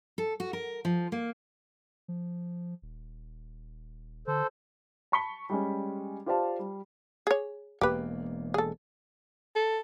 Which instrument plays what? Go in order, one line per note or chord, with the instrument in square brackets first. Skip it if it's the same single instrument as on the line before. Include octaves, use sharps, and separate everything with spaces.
[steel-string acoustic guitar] A4
F#4
A#4
F3
A#3
[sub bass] F3
D#1
[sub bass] D3 [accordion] A4 C5
[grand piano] A5 B5 C#6 B6 C#7 G7
G3 G#3 C#4
F4 G4 C5 D5 F5 A5
G3
[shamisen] G#4 C#5
[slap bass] E1 E2 A#3 [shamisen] G4 B4
[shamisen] G#4 A4
[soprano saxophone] A4